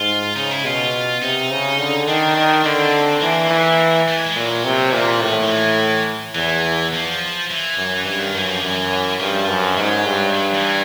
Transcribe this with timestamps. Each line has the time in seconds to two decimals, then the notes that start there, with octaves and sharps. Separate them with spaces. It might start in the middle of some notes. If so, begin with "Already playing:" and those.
Already playing: G#2 F4
0.36 C#3 D#4
0.51 E4
0.65 B2 F4
1.22 C3 D#4
1.51 C#3
1.79 D3
2.08 D#3 D4
2.36 D#3
2.64 D3 C4
3.21 E3 A#3
3.50 E3
4.08 A3
4.16 G#3
4.27 G#3
4.36 A#2 F#3
4.65 C3
4.93 A#2 E3
5.22 A2
5.43 F3
5.50 E3
6.35 E2 E3
6.93 F3
7.50 E3
7.78 F#2
8.06 G2 E3
8.20 D#3
8.35 F#2 E3
8.48 F3
8.61 F#2 E3
9.20 G2 F3
9.49 F#2
9.77 G#2 F#3
10.06 G2
10.34 F#3
10.54 E3